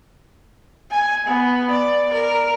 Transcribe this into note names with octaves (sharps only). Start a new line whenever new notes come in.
G#5
B3
D5
A#4